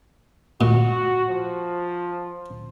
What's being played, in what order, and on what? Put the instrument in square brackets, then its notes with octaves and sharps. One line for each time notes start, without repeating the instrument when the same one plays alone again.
[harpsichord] A#2 [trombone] F#4
[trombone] F3